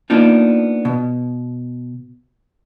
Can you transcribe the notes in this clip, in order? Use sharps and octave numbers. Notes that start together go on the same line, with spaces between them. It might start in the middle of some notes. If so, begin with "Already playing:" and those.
A#3 B3 D4 D#4 F4
B2